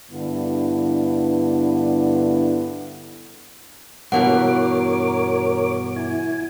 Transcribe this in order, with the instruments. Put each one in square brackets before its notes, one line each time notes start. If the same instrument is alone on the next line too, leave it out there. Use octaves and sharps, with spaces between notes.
[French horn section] G2 D3 B3 E4
[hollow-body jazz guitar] G2 B2 E3 [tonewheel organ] A#4 C#5 D6 [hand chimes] F#5
[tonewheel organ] E4 G#5